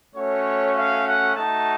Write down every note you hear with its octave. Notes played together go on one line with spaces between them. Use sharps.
A3 C#4 F#4 C#5
F5
F#5
A3 D#4 F#4 A5